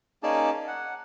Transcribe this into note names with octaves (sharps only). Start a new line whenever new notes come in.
A#3 C#4 D#4 G#4 D5 A5
F#5